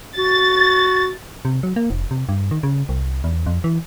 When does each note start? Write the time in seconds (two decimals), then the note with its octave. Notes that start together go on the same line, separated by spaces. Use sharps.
0.17 F#4 A6
1.45 C3
1.63 F#3
1.76 A#3
1.90 F1
2.11 C3
2.29 G2
2.51 D#3
2.63 C#3
2.89 C2
3.24 E2
3.46 F2
3.64 E3